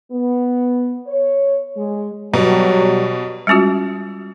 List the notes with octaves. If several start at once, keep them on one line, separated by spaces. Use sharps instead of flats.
B3
C#5
G#3
B2 F#3 G3
G3 G#3 C#4 F4 F#4